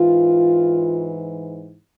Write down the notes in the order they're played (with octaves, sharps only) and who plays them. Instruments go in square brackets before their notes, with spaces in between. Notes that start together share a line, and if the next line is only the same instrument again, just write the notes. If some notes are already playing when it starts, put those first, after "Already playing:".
Already playing: [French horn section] G#2 E3 F4